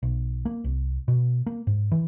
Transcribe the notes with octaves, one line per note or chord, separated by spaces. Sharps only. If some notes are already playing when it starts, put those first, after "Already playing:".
B1
A#3
C2
B2
A#3
G#2
E3